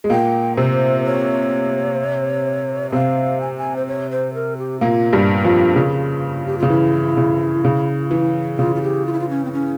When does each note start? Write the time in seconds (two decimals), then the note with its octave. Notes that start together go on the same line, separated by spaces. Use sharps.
0.04 G#3
0.10 A#2 A#3 G5
0.57 C3 C4 C5
1.04 C#5
2.90 E5
2.92 C3 C4 F5
3.41 G#5
3.57 G#5
3.76 C5
3.87 C#5
4.10 C5
4.34 A#4
4.58 G4
4.81 A#2 A#3 F4
5.13 G2 G3
5.45 F2 F3
5.76 C#3
6.46 G4
6.58 C#3 F4
6.70 E3 E4
7.17 C#3
7.65 C#3
8.11 E3
8.58 C#3 F4
8.75 F4
8.82 G4
9.06 F4
9.12 E4
9.20 F4
9.30 C#4
9.45 C4
9.52 C#4